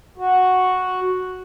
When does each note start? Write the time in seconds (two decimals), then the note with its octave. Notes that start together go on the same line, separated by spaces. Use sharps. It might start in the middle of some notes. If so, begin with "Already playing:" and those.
0.18 F#4